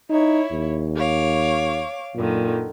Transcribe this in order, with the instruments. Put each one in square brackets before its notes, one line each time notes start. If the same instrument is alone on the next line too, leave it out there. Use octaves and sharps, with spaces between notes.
[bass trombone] D#4 [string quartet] E4 C#5
[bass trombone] D#2
[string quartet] C#5 F5 D6
[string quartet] F#2 D3 D#3 [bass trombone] A#2